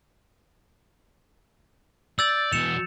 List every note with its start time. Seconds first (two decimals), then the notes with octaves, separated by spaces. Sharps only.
2.19 D5 E6 G6 A6
2.53 E2 B2 C#7 E7 F7